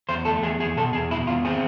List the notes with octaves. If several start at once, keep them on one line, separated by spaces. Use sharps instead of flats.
E2 C5
A3 A4
E2 G#4
E2 G#4
B2 A4
E2 G#4
B2 E4
E2 F4
C4 G#4